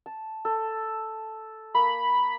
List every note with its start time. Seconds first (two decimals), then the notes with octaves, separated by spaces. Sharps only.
0.06 A5
0.45 A4
1.74 A#3 B5